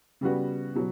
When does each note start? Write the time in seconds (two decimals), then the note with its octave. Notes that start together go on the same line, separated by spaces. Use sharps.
0.21 C#3 G3 B3 F#4
0.75 B2 F#3